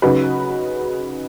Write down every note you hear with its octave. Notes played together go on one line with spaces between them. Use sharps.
C#3 F#3 D#4 F#4 B4